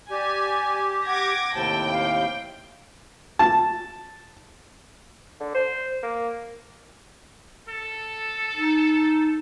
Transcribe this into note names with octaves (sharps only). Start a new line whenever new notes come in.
G4 D5 G#5
F#5 D6 G#6 A#6
D#2 A2 C3 G5 A5
F5
A5
D3
C5
A#3
A4
D#4